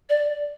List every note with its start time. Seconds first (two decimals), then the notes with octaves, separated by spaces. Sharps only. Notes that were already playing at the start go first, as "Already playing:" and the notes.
0.10 D5